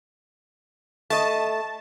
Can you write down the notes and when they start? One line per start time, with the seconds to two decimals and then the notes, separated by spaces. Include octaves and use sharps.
1.10 A3 D#5 A5